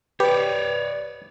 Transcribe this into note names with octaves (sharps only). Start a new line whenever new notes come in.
G4 B4 C#5 D5